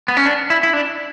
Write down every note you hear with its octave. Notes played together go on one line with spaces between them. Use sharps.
B3
C#4
D4
E4
E4
D4